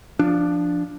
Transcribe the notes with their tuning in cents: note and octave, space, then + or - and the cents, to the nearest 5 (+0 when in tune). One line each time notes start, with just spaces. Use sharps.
F3 -5 D4 +0